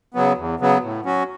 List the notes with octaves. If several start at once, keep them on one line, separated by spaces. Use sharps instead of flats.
C#3 F#3 B3
E2
C#3 F#3 B3
A2
F#3 C#4 F#4